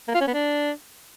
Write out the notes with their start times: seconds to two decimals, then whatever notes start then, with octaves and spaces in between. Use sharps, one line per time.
0.08 A#3
0.14 F4
0.21 C#4
0.27 B3
0.34 D4